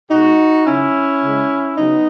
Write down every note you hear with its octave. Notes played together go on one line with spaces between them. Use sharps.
B2 G#3 D#4 F#4
C#3 F#3 C#4 E4
C#3 G#3
C#3 F#3 B3 D#4